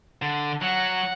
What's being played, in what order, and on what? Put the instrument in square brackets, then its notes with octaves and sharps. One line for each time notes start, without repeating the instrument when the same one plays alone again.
[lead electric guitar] D3
[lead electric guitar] F#3 [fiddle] F#5